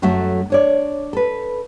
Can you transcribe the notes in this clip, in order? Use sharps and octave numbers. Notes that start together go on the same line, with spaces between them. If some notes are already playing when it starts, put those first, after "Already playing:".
F#2 F#3 A3 F#4 A4 E5
D4 C#5 D5
A4 B4